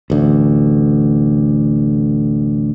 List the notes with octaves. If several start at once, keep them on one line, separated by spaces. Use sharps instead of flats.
A1 D2